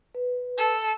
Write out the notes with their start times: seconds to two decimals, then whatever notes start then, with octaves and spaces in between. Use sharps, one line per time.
0.15 B4
0.58 A4